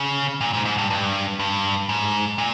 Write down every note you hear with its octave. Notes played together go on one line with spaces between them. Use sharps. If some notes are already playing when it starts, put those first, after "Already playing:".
Already playing: C#3
A#2
G#2
G#2
G2
G2
G2
G#2
A#2